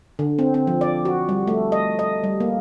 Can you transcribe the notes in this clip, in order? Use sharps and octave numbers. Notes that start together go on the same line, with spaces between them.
D3
C4
C4
F3
D5
F#4
G3
A3
D#5
D#5
G3
A#3